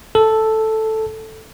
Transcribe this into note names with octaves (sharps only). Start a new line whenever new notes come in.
A4